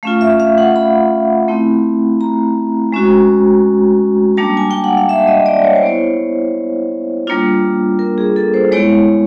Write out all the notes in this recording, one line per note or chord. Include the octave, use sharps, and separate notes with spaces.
A3 C#4 F4 F5
E5
F5
F#5
B5
A3 C4 E4
A#5
G#3 C#4 F#4
G3 A#3 D4 A5
G#5
G5
F#5
F5
E5
D#5
D5
C#5
C5
B3 E4 C#5
G3 A#3 D4 F4
A#4
G#4
A4
C5
G#3 B3 E4 C#5